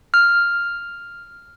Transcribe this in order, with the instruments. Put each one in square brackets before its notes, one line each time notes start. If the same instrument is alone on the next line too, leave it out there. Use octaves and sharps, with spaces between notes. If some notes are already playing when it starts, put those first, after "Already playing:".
[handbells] F6